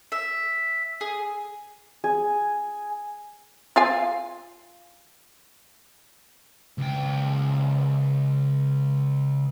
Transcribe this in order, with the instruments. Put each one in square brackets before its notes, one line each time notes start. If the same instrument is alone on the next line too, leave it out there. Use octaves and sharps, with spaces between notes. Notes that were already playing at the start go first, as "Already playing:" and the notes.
[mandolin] E5
G#4
[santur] G#4
[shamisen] F4 F5 G#5
[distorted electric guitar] C#2 G5